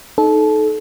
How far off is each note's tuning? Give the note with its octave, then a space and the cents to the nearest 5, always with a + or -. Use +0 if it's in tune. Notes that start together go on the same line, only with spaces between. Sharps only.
D#4 +0 A4 -25